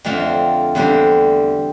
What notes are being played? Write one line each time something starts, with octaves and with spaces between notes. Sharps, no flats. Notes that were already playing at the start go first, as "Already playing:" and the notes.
F2 D3 A3 C4 F4
E2 D3 G3 C4